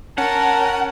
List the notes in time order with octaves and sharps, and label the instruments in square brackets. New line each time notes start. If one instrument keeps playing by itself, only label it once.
[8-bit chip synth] C#4 [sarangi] A#4 [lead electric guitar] F#5 [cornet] A5